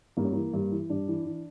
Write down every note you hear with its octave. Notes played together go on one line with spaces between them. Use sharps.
G2 A#3
C#4
E3 A#3
G2
E3
G2 D4
E3
E3